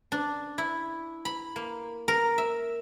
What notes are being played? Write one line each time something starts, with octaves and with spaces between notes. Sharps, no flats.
D4
E4
B5
A#3
A#4
E5